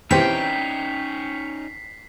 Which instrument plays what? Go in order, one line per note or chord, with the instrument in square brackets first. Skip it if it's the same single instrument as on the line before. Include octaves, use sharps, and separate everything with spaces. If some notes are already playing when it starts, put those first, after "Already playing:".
[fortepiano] E3 C4 G4 [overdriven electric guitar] C#4 D#4 [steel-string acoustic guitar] G5 [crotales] B6 C7